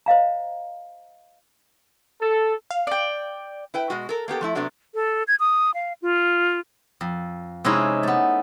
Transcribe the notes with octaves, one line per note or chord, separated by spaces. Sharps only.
C5 D#5 F5 A#5
A4
F5
D5 G5
E4 B4 G5
B2 G#3 F#4
A4 A#4
A#3 B3 G4 A4
F3 A3 E4 A5
C3 F#3 A3 B3 D4 F#4
A4
G#6
D#6
F5
F4
F2
C3 G#3 C#4 D#4 E4
A3 B3